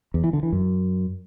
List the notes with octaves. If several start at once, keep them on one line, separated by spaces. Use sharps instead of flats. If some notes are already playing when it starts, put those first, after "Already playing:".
E2
E3
D3
E3
F#2